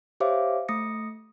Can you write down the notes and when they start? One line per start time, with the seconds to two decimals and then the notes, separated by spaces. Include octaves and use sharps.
0.20 G4 C5 C#5 E5 F5 D6
0.68 A3 D#6 A#6 C#7